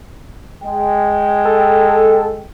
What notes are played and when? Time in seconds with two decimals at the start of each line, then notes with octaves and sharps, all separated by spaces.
0.63 G#3 G5
1.45 A4